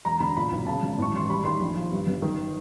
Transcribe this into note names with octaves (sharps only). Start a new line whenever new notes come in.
E1 A#5
D3 B5
A#2 B5
B1
C#3 A5
G#1
A2 C#6
A1 C6
G3 B5
D#3 C6
A#1
F3
G2
G1
D#3